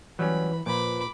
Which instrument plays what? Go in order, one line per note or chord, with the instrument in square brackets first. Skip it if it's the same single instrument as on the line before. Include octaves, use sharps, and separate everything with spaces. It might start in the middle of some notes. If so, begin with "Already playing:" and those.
[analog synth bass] E3 [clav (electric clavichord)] F#3 G3 C#4 [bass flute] B4 [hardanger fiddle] B5
[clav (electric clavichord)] A#2 [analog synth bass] F3 [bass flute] B4 [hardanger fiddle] B5 D6